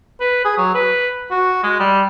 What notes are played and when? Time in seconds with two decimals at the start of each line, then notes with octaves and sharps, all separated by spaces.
0.21 B4
0.45 G#4
0.57 F#3
0.75 B4
1.31 F#4
1.63 G#3
1.80 G3